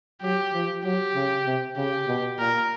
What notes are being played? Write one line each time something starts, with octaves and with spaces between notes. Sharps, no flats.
F#3 G4
F3
F#3 G4
C#3
C3
C#3 G4
B2
A#2 A#4